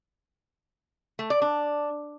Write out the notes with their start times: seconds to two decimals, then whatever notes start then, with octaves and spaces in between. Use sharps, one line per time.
1.19 A3
1.30 D5
1.42 D4